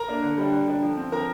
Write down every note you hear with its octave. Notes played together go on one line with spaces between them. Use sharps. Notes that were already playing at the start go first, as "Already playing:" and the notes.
Already playing: A#4 A#5
A#3 D4
D3
G3 D4
D3
G3 D4
F3
C4
F3 A#4 A#5